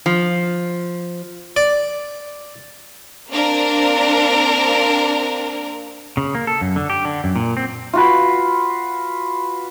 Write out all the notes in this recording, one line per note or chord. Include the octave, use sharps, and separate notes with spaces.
F3
D5
A#3 C4 D4 A#4
C#3
A#3
A4
F#2
D3
G4
D3
F#2
A#2
C4
F4 F#4 B4